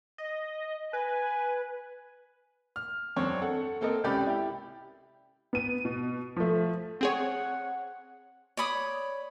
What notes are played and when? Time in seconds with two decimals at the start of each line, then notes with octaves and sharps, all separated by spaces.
0.18 D#5
0.93 B4 G#5
2.76 F6
3.16 E1 F#2 C4 D4 C#5
3.42 A4 F#5
3.81 A#3 C4 A4 A#4 D#5
4.04 C#2 C3 C#4 G4 D5 B5
4.26 E4 G4
5.53 B3 D#7
5.85 B2
6.36 F3 A3
7.01 C4 G#4 C#5 F#5
8.57 C#5 D5 B5 D#6